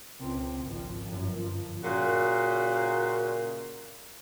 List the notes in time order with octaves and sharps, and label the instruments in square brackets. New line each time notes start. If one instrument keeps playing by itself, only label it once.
[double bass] C#2 C4
G#1 F3
G1 F#2
F3
[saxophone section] A#2 C#3 F#4